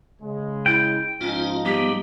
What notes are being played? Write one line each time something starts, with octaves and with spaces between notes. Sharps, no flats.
C#3 G#3
E4 G5
G#2 F3 C#4 D#4 F4 D#5
G3 B3 G4